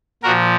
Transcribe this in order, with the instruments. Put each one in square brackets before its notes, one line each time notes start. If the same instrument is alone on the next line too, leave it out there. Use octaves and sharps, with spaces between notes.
[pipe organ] A#2 F3 F#4 A#4